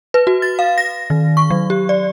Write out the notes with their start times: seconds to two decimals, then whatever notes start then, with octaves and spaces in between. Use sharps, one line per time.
0.14 B4
0.27 F#4
0.42 A6
0.59 F5
0.78 A#6
1.10 D#3
1.37 C#6
1.50 F#3
1.70 G4
1.89 D5